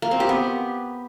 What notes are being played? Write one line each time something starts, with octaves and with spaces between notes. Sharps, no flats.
A#3
C4
G4
B3